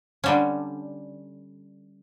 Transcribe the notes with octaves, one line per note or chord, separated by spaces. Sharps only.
D3 G3 C#4